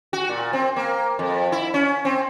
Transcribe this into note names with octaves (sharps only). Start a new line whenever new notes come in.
F#4
A#2
C4
A#3
F2
E4
C#4
C4